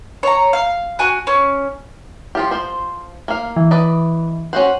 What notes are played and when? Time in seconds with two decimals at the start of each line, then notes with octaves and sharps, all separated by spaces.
0.23 C#5 A#5
0.53 F5
0.99 F#4 G#5 F#6
1.27 C#4
2.35 F3 F4 G4
2.51 F3 C5
3.28 A#3 F5
3.56 E3
3.71 B4 D5 D#5
4.53 C#4 F#4 C5 F#5